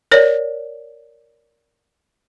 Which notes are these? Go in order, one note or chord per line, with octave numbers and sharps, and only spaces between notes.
A#4 C#5 D5